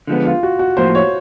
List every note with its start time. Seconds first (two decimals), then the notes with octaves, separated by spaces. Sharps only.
0.07 D3 F3 G#3 B3
0.26 F4
0.43 F#4
0.59 F#4
0.77 A2 F3 A#3 C5
0.95 C#5